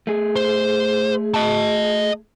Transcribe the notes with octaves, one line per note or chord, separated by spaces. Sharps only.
A3 G#4
C5
D#5 A5